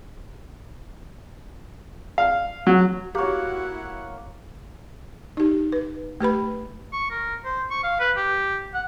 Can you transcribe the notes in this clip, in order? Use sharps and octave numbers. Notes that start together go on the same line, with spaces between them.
F5
F#3
A#3 E4 F#4 G4 C#5 F#5
D#4 G4
B4
A3 G4 B4 B5
C#6
A#4
C5
C#6
F5
B4
G4
F#5